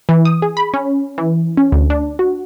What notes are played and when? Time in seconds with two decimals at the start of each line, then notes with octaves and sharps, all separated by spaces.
0.09 E3
0.25 D#6
0.42 G#4
0.57 B5
0.74 C#4
1.18 E3
1.57 C#4
1.72 D2
1.90 D4
2.19 F#4